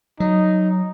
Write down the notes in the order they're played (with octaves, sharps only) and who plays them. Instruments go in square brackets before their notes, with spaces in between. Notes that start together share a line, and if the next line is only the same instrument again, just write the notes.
[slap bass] F#3 [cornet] D#4